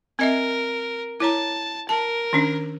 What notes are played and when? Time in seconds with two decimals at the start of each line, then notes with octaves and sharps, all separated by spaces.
0.19 C4 A#4 D#5 E5
1.20 E4 C#5 A5 A#5
1.89 A#4 A5
2.33 D#3 C#4 D4